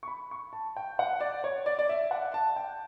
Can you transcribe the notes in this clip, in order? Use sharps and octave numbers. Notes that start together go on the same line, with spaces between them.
C#6
B5
C#6
A5
G5
F#5
D5
C#5
D5
D5
E5
F#5
A5
G5